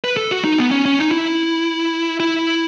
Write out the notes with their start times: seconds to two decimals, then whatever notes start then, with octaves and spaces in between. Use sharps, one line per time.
0.04 B4
0.17 A4
0.31 F#4
0.44 D#4
0.58 B3
0.71 C#4
0.85 C#4
0.99 D#4
1.11 E4
2.20 E4